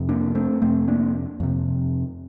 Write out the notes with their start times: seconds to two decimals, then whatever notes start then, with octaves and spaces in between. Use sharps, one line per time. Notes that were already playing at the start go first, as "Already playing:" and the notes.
Already playing: F2 C3
0.09 A#3 D4
0.35 A3 C4
0.62 F2 C3 A3 C4
0.88 A#3 D4
1.40 F2 C3